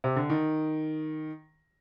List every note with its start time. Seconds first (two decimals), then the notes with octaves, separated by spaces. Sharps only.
0.04 C3
0.16 D3
0.30 D#3